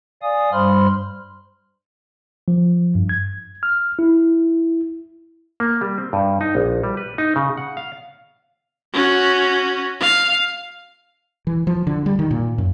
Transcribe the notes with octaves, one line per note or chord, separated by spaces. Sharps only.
D5 F5 G#5 D#6
G2 G3 C5 B5 C6 F6
F3
G2
G#6
F6
E4
A#3
G3
C4
G2
D#4
A#1
G3
B4
D#4
C#3
F#5
F5
C#4 F#4
F5
E3
F3
D3
G3
D#3
A#2
F#2